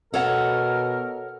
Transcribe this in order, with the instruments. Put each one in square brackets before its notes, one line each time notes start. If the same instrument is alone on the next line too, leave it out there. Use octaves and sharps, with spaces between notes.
[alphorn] B2 [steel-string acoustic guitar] A4 C#5 F#5 [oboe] A#4